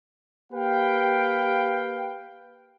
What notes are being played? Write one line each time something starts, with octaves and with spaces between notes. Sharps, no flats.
A#3 G4 B4 F5 G5